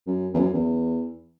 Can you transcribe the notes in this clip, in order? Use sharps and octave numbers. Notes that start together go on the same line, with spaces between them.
F#2
E2
F#2
E2